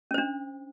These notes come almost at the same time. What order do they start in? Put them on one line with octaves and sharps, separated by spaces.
C#4 C5 D4